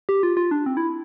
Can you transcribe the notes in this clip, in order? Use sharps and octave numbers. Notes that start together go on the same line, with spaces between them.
G4
F4
F4
D4
C4
E4